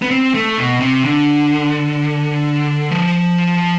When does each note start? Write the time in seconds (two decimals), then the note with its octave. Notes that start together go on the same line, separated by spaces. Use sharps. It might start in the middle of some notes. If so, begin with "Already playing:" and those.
0.02 B3
0.11 C4
0.34 A3
0.58 B2
0.81 C3
1.04 D3
2.91 F3